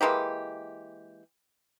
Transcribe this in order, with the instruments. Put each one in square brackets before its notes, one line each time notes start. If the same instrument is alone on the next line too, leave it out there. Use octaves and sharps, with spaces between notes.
[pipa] E3 G#3 A#3 G4